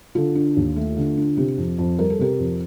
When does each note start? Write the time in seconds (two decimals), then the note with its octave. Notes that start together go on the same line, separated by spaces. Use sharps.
0.15 D3 F4 A4
0.35 D4
0.57 D#2
0.76 A3
0.97 D3
1.17 D4
1.37 C3 G4
1.58 F2
1.78 F2
1.99 G3 A#4
2.10 A4
2.19 C3 G4 A#4
2.39 F2